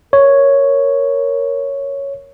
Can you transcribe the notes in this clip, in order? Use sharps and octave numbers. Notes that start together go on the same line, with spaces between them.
A#4 C#5